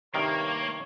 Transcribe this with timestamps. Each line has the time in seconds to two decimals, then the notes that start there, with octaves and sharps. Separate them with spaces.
0.14 G2 C3 D#3 A#3 C#5